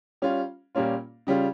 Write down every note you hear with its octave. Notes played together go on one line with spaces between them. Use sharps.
G3 C#4 F4
A#2 G3 A#3 C#4 F4
C#3 G3 C#4 F4